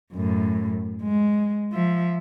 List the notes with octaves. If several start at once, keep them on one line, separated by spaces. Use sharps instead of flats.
F#2 A2
G#3
F3 E5